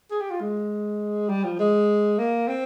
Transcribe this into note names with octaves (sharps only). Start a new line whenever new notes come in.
G#4
G4
F4
G#3
G3
F3
G#3
A#3
C4